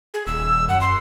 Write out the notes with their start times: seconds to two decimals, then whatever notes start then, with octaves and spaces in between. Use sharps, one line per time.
0.14 G#4
0.27 D#1 E6
0.69 F#2 F#5
0.81 C6